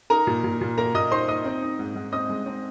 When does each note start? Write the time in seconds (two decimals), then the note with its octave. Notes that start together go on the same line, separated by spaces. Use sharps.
0.10 D#4 A#4 A#5
0.27 A#2
0.44 A#2
0.61 A#2
0.78 A#3 A#4 A#5
0.94 A#2 D#5 D#6
1.11 D#4 C5 C6
1.28 D#4 D#5 D#6
1.45 C4
1.62 D#4
1.79 G#2
1.95 G#2
2.12 C4 D#5 D#6
2.29 G#3
2.46 C4